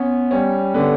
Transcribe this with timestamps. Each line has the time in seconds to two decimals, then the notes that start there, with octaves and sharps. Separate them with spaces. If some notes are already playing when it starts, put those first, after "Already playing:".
Already playing: B3 C#4
0.31 G3 C#4
0.74 D3 B3